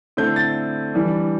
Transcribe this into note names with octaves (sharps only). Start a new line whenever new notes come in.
D3 A3 C4 E4 G6
A6
E3 G3 D4